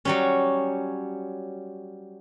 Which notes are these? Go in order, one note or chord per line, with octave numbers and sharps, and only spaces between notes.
F#3 G3 C#4